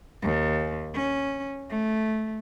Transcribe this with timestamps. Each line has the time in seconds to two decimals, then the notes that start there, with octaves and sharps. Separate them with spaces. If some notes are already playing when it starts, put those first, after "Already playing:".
0.22 D#2
0.94 C#4
1.70 A3